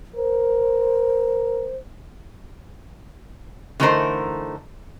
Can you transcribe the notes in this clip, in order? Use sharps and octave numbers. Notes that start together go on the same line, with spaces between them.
A#4 C5
D3 E3 A3 D#4 A#4 C5